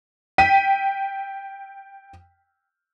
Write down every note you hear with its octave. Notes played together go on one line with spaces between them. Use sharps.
G5 B6 D#7